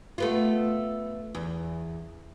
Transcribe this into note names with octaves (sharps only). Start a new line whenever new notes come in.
A3 B3 F4
E2